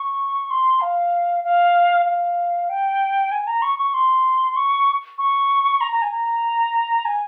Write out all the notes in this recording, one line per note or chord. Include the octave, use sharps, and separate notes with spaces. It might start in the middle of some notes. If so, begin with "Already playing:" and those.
Already playing: C#6
C6
F5
F5
F5
G5
G#5
A#5
C#6
C#6
C6
C#6
C#6
A#5
A#5
G#5
A#5
G#5